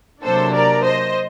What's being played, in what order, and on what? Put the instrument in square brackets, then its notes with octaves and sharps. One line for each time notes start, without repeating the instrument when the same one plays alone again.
[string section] C3 F#3 A#3 D4 A4 C5
A#4 D5
C5 D#5